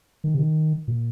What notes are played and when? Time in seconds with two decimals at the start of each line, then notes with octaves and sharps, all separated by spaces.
0.24 D#3
0.35 C3
0.39 D#3
0.88 A#2